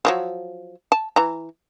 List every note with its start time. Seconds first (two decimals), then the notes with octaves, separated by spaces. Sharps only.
0.05 D3 F3 F#3
0.92 A5
1.16 E3 A#5